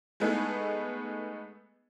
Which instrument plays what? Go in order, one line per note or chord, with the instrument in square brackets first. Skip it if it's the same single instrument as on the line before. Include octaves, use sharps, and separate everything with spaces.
[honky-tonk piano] G#3 A3 B3 D#4 G#4